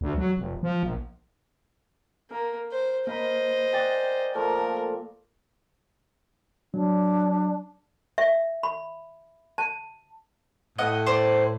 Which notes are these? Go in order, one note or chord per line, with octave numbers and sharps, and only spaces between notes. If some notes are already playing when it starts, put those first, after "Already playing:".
D2
F#3
F1
F3
A#1
A#3 A#4
C5
A#3 A#4 C5 D#5 B5
G#4 D5 F#5 G5 A6
F3 A3 A#3 A#4
F#3 D4
E5
B5
A5
A2 D#5 F#5
C5 D5